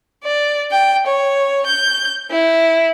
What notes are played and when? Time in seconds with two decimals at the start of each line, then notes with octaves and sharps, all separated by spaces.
0.23 D5
0.72 G5
1.07 C#5
1.66 G6
2.31 E4